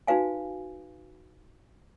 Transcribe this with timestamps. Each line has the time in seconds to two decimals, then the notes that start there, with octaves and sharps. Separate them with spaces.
0.07 D#4 F#4 B4 F5 G#5